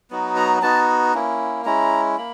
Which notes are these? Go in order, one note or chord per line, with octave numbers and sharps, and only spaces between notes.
F#3 B3 D#4 F#4
A#5
B3 D#4 F#4 A5
A#3 C#4 E4
G#3 C#4 E4 A#5
A#3 B5